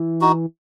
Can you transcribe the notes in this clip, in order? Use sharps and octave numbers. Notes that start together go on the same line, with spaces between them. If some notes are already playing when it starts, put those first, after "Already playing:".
Already playing: E3
D#4 F#4